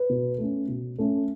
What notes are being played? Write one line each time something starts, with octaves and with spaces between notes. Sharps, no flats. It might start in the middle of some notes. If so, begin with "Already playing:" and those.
Already playing: B4
B2
A3 C#4
B2
A3 C#4